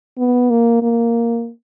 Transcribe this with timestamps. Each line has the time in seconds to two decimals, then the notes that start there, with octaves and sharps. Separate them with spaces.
0.18 B3
0.50 A#3
0.83 A#3